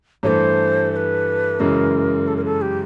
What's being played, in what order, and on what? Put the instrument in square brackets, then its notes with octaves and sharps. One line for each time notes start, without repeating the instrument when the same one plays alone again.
[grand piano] G2 E3 A3 [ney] C5 C#5
[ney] C5
B4
[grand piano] F#2 C#3 E3 G#3 [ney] A#4
[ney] A4
A#4
A4
G4